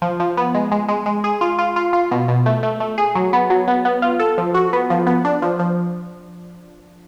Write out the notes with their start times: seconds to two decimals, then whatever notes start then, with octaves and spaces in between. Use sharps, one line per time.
0.02 F3
0.20 F3
0.37 B3
0.54 G#3
0.71 G#3
0.89 G#3
1.06 G#3
1.24 G#4
1.41 F4
1.59 F4
1.76 F4
1.93 F4
2.11 B2
2.28 B2
2.46 A3
2.63 A3
2.80 A3
2.98 G#4
3.15 F#3
3.33 B3
3.50 F#3
3.68 B3
3.85 B3
4.02 F4
4.19 A4
4.38 F3
4.54 F#4
4.73 B3
4.90 F3
5.07 B3
5.25 D4
5.42 F3
5.59 F3